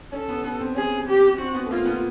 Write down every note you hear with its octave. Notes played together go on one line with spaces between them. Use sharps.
C#4 A4
B3
B3
C4
C#4 G#4
G4
C4 F#4
B3
A3
A#3 F4
B3